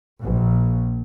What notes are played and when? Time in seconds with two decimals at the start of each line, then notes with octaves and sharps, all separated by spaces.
0.22 A#1